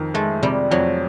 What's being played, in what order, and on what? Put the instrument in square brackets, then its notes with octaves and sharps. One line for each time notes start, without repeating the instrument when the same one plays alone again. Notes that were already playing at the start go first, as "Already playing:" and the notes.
Already playing: [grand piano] F2 D#3
[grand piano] G#3 [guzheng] A3
[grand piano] C3 [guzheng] G3
[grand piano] F2 [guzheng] F#3